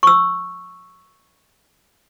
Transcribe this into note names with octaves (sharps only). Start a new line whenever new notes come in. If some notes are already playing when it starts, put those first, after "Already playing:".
C#6 E6